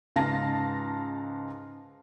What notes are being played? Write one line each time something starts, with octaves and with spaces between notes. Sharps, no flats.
C#2 G#2 F5 A5 A#6